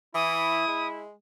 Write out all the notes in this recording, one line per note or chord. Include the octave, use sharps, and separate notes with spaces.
E3 E4 D#6
G#3